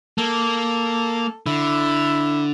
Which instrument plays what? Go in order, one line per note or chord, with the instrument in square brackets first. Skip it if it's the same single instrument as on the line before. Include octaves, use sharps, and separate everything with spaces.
[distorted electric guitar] A#3 [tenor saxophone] A4
[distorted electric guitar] D3 [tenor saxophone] E4